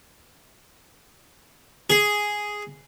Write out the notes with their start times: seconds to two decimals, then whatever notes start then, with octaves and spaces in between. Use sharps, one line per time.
1.90 G#4